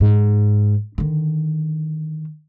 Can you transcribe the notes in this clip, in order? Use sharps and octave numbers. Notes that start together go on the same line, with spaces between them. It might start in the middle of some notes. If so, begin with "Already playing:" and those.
G#2
D3 D#3